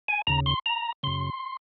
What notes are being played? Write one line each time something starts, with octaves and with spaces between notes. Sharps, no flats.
G#5
D#2 C#3 A#5
C6
A#5
F#2 C#3 C6